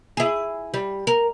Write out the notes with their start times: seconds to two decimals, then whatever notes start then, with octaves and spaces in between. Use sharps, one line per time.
0.17 E4 G#4
0.74 G3
1.07 A#4